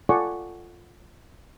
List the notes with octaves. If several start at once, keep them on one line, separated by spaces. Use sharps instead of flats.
F4 A4 D5 F#5 G#5 C#6